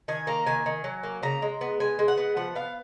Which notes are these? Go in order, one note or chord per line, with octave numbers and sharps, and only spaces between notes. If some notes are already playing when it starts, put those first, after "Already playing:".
D#3 G#5
A#3 A#5
D#3 G#5
D#3
F#3
A#3
C#3 A#5
G#3
B3
G#3 G#5
G#3
F#5
B3
F3 F#5
B3 F5